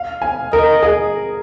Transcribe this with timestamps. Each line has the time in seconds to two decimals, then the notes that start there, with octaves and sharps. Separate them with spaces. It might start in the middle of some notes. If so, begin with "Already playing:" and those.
Already playing: F5
0.22 G#5
0.53 A#4 D#5
0.83 G#4